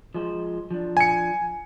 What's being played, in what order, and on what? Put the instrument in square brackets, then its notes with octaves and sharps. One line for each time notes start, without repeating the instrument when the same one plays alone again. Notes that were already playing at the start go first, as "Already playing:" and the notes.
[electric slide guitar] F3 G#3 C5
F3 D4
[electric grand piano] G#5 C#7